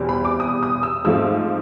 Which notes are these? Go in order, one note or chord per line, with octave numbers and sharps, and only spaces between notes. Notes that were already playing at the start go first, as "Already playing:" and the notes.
Already playing: E2 B2 G3 C4
B5
D6
D#6
D#6
E6
G#2 F3 A3 C4 E6